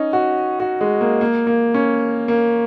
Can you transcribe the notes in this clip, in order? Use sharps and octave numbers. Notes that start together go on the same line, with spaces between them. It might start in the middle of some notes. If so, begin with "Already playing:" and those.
Already playing: C#4 D#4
F#4
F#4
G#3
A#3
A#3
A#3
C#4
A#3